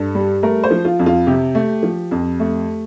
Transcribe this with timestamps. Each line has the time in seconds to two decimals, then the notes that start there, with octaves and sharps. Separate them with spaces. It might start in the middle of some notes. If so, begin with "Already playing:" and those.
Already playing: G2 A4
0.15 G3
0.43 A3 A#4
0.64 C5
0.71 F3
0.85 F4
0.99 F2
1.06 F4
1.27 C3 G4
1.55 A3
1.83 F3
2.11 F2
2.40 A3